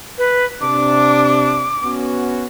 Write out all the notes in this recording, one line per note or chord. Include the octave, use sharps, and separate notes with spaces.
B4
C3 D4 D6
B3 C#4 F#4